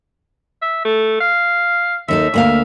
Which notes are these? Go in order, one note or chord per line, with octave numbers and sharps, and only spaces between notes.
E5
A3
F5
D#2 D#4 A4 E5
D2 A#3 F5